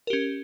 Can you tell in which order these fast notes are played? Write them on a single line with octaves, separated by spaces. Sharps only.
A#4 G4 C#4